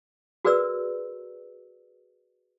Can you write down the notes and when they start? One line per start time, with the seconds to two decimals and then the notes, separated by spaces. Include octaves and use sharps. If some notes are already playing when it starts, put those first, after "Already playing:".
0.45 F#4 G#4 A#4 B4 D5 E6